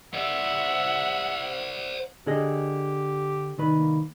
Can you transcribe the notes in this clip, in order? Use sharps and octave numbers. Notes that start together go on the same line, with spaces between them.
C5 D5 E5 F#5
D3 G4 G#4 D#5
C2 D#3 B4
A#3